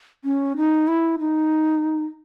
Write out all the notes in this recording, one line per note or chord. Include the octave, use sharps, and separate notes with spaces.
C#4
D#4
E4
D#4